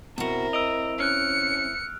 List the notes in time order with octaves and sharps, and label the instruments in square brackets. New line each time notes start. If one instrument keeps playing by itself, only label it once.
[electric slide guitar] B2 F#4 [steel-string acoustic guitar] C4 E4 [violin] A#4
[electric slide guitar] D#5 [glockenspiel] E6 D7 F7
[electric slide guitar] C#4 [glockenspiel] F6 F#6 [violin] C#7